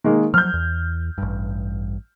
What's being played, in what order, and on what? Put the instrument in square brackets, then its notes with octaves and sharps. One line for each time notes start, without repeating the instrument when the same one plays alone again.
[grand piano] D#3 G#3 A#3
[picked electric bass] F3 F#3 [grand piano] F6 G6
[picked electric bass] E2
A1 G2